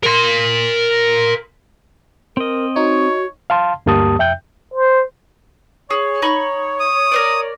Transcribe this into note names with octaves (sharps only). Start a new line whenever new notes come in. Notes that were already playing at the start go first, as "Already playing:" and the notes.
A#4 C6
C4 A#4 D#5
D#4 F#4 C#5
F5 A5 C6
D2 G2 A#3 G4 A5 D#6
F2 E5 G5 G6
C5
G#4 C#5
D#4 B5 C#6
D#6
A#4 C5 D5